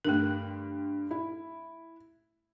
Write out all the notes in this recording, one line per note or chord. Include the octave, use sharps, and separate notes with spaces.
G2 D3 A3 A#4
E4